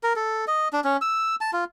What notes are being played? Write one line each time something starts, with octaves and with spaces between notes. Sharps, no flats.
A#4
A4
D#5
D4
C#4
E6
A5
F4